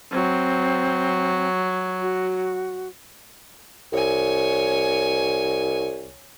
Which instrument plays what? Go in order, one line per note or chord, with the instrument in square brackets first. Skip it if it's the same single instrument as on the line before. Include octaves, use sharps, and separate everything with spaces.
[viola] F#3 [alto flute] C4
[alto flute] F#4
[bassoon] C2 [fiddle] C#5 G#5